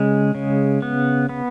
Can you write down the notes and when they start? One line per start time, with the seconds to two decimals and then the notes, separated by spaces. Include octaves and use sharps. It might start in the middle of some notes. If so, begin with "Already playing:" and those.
Already playing: C#3 G#3
0.35 C#3
0.82 B3
1.29 B3